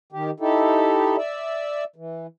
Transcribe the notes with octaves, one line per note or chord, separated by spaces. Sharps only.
D#3 G4
D#4 E4 G4 A4
D5 E5
E3